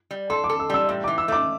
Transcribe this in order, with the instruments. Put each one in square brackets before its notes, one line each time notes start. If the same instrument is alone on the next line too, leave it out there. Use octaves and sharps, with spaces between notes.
[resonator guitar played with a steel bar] G3
[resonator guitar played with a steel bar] A4 [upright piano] C6
[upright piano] D6
[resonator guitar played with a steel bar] A4
[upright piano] E6
[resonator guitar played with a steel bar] G3 [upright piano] E6
[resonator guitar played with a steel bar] A2 [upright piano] E6
[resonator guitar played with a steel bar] E3 [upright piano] D6
[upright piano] E6
[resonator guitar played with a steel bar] A3 [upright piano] D6